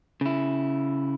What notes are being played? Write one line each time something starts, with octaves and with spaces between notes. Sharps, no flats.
C#3 E4